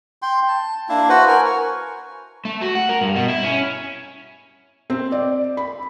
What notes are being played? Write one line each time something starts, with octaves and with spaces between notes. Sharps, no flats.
G5 C6
A5
A#3 D4 E4
F#4 B4 C5 F#5
A#4 G#5
C#6
A3
F#4
F#5
A#4
G2
B2
E4
C#4
C4
D5
B5